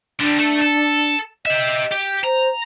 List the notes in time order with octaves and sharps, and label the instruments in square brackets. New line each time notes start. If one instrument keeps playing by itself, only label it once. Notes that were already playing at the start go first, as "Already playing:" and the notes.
[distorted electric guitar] D3 G3 [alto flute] D4
[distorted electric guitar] A3 A4
A4
[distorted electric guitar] G4 E5 [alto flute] D#5
[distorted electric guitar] G4
[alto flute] C5 [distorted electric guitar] A#5